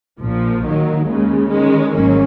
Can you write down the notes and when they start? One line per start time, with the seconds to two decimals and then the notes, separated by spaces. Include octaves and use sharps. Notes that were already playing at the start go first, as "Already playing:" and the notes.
0.20 A#1 A#2 F3
0.63 D#3 F#3 A#3
1.06 D#2 C#3 G#3
1.49 D#3 G#3 C#4
1.91 G#1 G#2 F#3 A#3 C#4